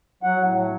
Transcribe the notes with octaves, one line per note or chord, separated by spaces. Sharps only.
F#3 F#5
A2
F#3